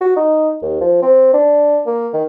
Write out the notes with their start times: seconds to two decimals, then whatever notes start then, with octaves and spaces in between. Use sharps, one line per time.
0.01 F#4
0.17 D#4
0.62 D#2
0.81 F3
1.02 C4
1.34 D4
1.87 A#3
2.14 D#3